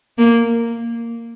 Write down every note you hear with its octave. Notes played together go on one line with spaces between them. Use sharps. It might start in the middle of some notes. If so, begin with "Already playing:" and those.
A#3